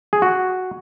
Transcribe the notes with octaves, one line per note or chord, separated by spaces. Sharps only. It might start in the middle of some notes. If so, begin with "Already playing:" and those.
G#4
F#4